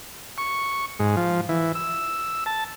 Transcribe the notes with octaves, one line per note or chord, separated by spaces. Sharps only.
C#6
G#2
F3
E3
E6
A5